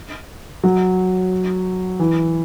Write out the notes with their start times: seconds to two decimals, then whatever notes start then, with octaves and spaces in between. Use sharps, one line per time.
0.63 F#3
1.99 E3